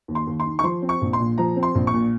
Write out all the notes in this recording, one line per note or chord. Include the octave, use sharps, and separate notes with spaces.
D#2
C6
D#2
C6
D#3
C#6
F3 C6
C4
C#6
A#1
C6
A#2
F3 A#5
C4
C6
A#1
C#6
A#2